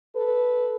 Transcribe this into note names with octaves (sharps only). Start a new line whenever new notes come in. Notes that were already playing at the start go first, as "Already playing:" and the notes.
A4 B4